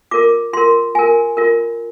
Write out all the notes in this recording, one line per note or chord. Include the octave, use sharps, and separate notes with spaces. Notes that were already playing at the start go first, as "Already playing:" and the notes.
F4 A#4 D6
F4 A#4 C6
F4 A#4 G#5
F4 A#4